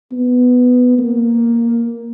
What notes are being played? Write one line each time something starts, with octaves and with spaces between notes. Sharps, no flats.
B3
A#3